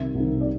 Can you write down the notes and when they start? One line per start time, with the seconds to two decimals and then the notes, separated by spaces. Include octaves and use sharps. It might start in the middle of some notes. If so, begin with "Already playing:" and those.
Already playing: C2 C3 D#3 E5
0.15 C2 C3 D#3
0.41 D5